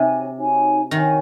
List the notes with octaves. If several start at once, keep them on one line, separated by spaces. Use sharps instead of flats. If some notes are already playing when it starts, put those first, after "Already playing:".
Already playing: C3 D#4 F#4 C#5 G#5
D#4 F#4 C#5 G#5
D#3 D#4 F#4 C#5 G#5